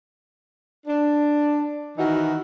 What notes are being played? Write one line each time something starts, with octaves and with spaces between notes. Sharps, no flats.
D4
D#3 E3 D#4 F#4